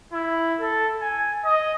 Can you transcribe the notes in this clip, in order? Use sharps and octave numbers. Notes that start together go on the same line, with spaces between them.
E4
A4
G#5
D#5